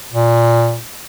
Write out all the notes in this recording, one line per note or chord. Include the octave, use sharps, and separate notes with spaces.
A#2